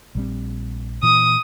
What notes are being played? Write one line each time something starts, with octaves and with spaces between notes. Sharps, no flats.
A#1 G3 C4
A#2 E3 D#6